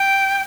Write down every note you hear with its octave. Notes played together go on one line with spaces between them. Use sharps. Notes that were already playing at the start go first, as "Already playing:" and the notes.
Already playing: G5